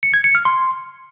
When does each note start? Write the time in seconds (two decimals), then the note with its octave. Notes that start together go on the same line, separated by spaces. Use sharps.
0.03 C#7
0.14 G#6
0.24 C#7
0.35 F6
0.45 C6